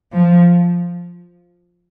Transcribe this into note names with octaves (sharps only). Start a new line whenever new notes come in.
F3